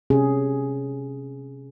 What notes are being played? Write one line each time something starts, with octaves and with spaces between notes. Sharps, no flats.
C3 C#4 G#4